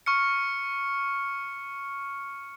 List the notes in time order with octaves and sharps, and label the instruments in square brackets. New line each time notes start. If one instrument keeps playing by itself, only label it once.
[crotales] C#6 F6 C#7